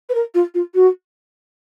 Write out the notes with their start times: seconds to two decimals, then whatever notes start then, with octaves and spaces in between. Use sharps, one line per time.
0.09 B4
0.14 A#4
0.34 F4
0.54 F4
0.74 F#4